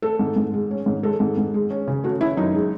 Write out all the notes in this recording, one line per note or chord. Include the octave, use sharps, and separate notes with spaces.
A3 A4
G#2
G#2
G#3
C#4
G#2
G#3 A4
G#2
G#2
G#3
C#4
C#3
A3 F#4
C#4 E4
F#2 D#4
G#3